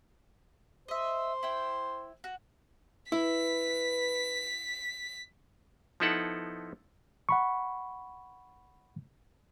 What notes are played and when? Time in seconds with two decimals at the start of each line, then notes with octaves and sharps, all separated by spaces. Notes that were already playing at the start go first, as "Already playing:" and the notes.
0.88 C5 D#5 E5
1.43 E4 G5
2.24 F#4
3.12 E4 B4 B6
6.00 F3 B3 D#4 E4 A4 F#5
7.29 F#5 B5 C#6